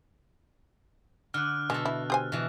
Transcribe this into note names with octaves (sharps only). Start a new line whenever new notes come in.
D3 F6 F#6
B2 G#3 A4
E4
G4 C5 G#5
B2 E3